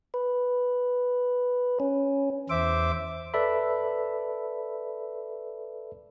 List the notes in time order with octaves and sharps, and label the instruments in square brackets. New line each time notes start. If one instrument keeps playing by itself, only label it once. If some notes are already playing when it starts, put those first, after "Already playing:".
[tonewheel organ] B4
C#4
[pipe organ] E2 C5 E5 D6
[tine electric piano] A4 B4 D5 E5 B5